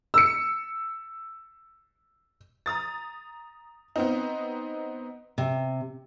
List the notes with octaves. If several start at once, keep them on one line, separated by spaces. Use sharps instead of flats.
E6 C#7
A#5 D#6 A6
B3 C4 D#4
C3